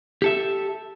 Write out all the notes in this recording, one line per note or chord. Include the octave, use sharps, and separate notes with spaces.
G4 A4 E5